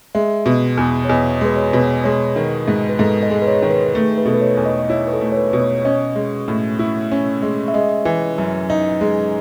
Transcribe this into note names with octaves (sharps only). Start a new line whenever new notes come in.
G#3 E5
B2
E2
C#5
E2 D#5
G#3 B4
C#5
B2
G#3 C#5
D#3
G#2
B4
G#2 A4
D#5
G#3
B4
C#5
D#3
B4
A3 G#4
B4
B2 A4
B4
C#5
E2
D#5
D#5
E4 C#5
B4
A4
A3
C#5
B4
B2
C#5
C#4 D#5
G#3
A2
E4
C#4
G#3
E5
G#3 D#5
E3
F#2
D#4
G#3